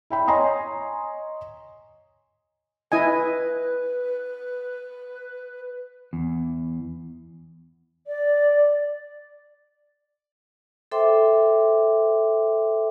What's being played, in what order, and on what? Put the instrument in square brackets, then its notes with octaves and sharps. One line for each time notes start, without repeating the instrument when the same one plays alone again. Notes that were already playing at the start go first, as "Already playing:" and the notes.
[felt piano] E4 G5 B5
C#5 D#5 G#5 A#5 C6 D#6
[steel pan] E4 D#5 G#5 [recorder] B4
[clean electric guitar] E2
[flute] D5
[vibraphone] A4 C5 E5 G5 C6 D6